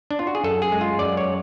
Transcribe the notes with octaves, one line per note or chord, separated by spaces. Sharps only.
D4
F4
F#4
G#4
F#2 A4
G#4
G#3
F4
F#2 D5
C#5